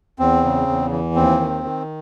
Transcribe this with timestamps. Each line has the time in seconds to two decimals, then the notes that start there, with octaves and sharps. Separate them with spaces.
0.19 E2 C4
0.44 C#3
0.67 E2
0.91 E3
1.15 D#2 C4
1.39 D#3
1.63 D#3